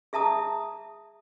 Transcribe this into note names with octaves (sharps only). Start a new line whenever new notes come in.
G#4 E5 A5 A#5 D#6